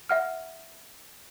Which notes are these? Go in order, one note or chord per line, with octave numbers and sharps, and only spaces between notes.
E5 F#5 F6